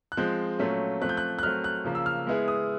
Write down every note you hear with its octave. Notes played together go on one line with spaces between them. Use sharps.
F#6
F3 G#3 C4 G6
A#2 F#3 A3 C#4 F4
F3 A3 C4 F#6
G6
F#6
F#6
F#3 A3 C4 F6
F#6
C#3 F3 A#3
E6
F6
G#3 B3 E4 G#4
D#6